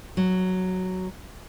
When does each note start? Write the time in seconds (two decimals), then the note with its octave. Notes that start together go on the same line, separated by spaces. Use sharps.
0.17 F#3